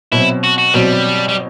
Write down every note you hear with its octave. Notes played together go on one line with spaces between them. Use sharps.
B2 F#3 C4 E4
F#4
F#4
B2 F#3 G3 C4
G3